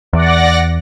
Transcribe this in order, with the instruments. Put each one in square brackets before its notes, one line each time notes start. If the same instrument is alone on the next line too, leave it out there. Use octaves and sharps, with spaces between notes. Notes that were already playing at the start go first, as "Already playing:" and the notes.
[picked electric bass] E2 [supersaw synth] D5 F#5 A#6